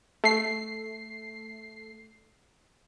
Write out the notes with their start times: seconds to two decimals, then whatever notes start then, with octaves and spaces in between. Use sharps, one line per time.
0.24 A3 C7